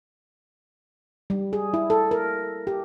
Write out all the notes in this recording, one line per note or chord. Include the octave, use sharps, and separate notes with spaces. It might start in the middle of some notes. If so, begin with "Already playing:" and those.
G3
G#4
E4
A4
A#4
G4